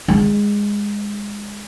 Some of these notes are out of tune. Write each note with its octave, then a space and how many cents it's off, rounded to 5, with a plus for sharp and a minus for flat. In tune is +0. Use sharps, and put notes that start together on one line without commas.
G#3 -15